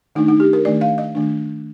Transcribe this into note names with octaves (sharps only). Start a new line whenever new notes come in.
D#3 A3 D4 D#4
D#4
G4
A#4
D#3 A3 D4 D5
F5
D#5
D#3 A3 D4